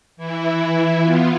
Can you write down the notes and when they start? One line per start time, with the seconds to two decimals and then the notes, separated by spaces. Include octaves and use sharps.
0.17 E3 E4
1.02 B3 F4